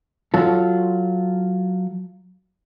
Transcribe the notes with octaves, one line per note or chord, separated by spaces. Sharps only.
F#3 F4 A4